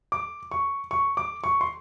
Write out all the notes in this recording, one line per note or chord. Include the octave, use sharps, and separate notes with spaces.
D6
C#6
C#6
D6
C#6
C6